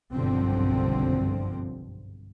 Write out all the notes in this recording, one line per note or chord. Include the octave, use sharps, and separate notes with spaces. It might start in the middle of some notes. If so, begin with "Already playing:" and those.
F#1 B1 G2 D3 F3 C4